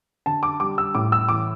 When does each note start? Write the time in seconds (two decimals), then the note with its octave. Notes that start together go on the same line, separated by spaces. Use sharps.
0.26 D3 A5
0.43 D6
0.60 G3 D6
0.78 E6
0.95 A2 D6
1.12 E6
1.29 E3 D6